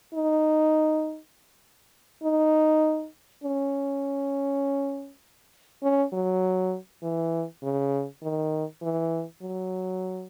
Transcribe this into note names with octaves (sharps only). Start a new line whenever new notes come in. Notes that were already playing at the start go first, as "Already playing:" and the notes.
D#4
D#4
C#4
C#4
F#3
E3
C#3
D#3
E3
F#3